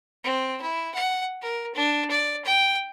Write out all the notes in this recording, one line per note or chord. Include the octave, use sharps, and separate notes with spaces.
C4
E4
F#5
A#4
D4
D5
G5